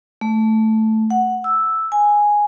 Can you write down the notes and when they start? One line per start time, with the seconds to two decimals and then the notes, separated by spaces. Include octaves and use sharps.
0.21 A3
1.10 F#5
1.44 E6
1.92 G#5